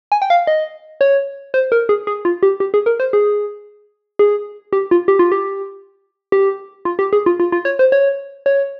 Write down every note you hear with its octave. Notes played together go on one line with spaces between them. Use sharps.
G#5
G5
F5
D#5
C#5
C5
A#4
G#4
G#4
F4
G4
G4
G#4
A#4
C5
G#4
G#4
G4
F4
G4
F4
G4
G4
F4
G4
G#4
F4
F4
F4
C#5
C5
C#5
C#5